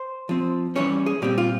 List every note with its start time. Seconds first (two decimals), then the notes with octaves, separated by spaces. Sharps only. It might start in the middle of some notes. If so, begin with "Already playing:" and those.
Already playing: C5
0.29 F3 C4
0.76 E3 G3 C#4 C#5
1.06 G#4
1.22 A#2 G3 C4 G4
1.38 F4